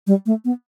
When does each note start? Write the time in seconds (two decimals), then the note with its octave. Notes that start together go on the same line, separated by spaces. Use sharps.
0.07 G3
0.26 A3
0.45 B3